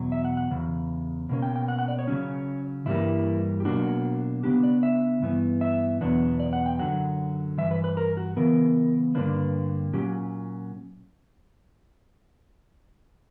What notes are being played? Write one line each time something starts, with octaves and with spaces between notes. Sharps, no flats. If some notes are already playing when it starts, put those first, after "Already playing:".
Already playing: E2 B2 F#3
E5
F#5
F#5
E2 C#3
B2 A#3 C#4
G5
G5
F#5
F#5
D5
C#5
C#3 F#3 C#4
G2 E3 G3 A#3 E4
G4
B2 F#3 A#3 D4 F#4
C#3 E3 B3 D4 G4
D5
E5
G2 E3 B3
E5
E2 B2 F#3 B3 D4
D5
F#5
G5
F#2 D3 F#3 F#5
G2 E3 E5
B4
B4
A#4
F#4
C#3 E3 B3 A#4
G2 D3 G3 A#3 D4 B4
A#2 F#3 C#4 G4